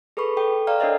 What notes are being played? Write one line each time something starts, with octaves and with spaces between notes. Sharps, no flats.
G#4 A4 B4 B5 C#6
A4 G5
D5 F5 G5 A#5 F6
D4 A4 A#4 C#5 D#5 E5